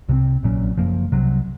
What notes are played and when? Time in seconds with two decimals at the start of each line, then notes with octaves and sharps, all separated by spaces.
0.09 C2 C3 F#3 C4
0.43 A#1 A#2 F#3 C#4
0.77 F#1 F#2 F3 A#3
1.12 C2 C3 F#3